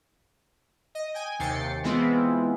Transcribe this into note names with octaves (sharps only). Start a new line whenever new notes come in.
D#5
G5 G#5
D#2 C3 G5 A6 C7 C#7
E3 G#3 B3 C4 E4 F4